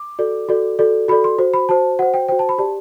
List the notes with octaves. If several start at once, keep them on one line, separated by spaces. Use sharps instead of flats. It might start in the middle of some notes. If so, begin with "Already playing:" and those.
Already playing: D6
F#4 A4 D5
F#4 A4 D5
F#4 A4 D5
F#4 A4 D5 B5
C6
F#4 C5
B5
F#4 C5 A5
F#4 C5 F#5
G5
F#4 C5 G5
A5
B5
G4 D5 A5